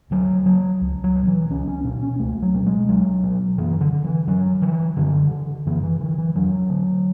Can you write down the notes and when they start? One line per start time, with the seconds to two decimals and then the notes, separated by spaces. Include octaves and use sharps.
0.11 D2 F#3
0.45 C#3 F#3
0.81 C#2
1.04 F#3
1.15 B2
1.27 E3
1.50 C#2 C#4
1.68 C#4
1.84 B2 D4
2.03 C#4
2.19 C#2 A3
2.42 F#3
2.54 B2
2.66 G#3
2.89 C#2 F#3
3.23 B2
3.58 F#2 E3
3.81 D3
3.92 D3
4.05 E3
4.27 F#2 F#3
4.62 D3 E3
4.97 F#2 D3
5.31 D3
5.66 F#2 E3
5.83 E3
6.00 D3 E3
6.18 E3
6.36 E2 F#3
6.70 D3